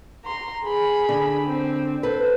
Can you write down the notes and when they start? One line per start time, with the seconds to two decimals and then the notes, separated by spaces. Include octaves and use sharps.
0.25 A#5 C6
0.65 G#4 B5
1.09 D3
1.47 C4
2.03 A4 B4 C5